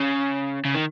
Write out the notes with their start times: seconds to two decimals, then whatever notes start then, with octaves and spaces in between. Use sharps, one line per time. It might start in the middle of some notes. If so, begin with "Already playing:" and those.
Already playing: C#3
0.65 C#3
0.75 D#3